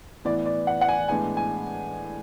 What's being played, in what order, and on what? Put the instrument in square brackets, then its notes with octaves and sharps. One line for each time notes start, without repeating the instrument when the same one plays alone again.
[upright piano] A2 E3 B3 D5
D5
F#5
F#5
G#5
A2 E3 G#3 B3 D4 G#5
G#5